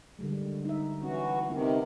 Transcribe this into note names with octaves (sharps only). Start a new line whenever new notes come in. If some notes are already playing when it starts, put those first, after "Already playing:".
D3 G3 G#3
D#4 E5
E3 C#4 F#4
C3 D#3 B3 E4